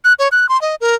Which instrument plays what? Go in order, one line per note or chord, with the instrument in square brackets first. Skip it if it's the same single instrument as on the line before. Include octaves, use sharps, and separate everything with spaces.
[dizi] F#6
C#5
F#6
C6
D#5
A#4